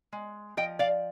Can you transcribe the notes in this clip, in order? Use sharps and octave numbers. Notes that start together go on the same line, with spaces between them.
G#3
F3 D#5 G5
D5 F5